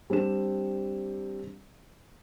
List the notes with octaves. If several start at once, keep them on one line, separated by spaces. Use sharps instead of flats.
G3 C4 D4 E7